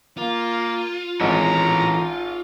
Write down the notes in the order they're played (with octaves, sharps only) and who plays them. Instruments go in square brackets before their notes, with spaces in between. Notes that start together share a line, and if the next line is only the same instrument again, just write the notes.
[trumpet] A#3 [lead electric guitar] F4
[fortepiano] G#1 [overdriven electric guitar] E3 C#4 [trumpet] A#5